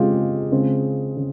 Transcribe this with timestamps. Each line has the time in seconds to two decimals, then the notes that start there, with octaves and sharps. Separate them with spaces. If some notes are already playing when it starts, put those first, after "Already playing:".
Already playing: C#3 G#3 C4 F4 G4
0.52 C#3 G#3 C4
1.17 C#3